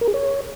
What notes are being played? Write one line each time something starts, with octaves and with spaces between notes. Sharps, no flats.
A#4
G#4
C#5